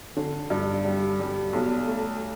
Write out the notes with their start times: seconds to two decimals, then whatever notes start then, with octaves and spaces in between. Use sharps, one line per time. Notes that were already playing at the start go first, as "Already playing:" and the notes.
0.16 D3
0.50 G2
0.85 G3
1.20 G3
1.53 B1
1.88 A3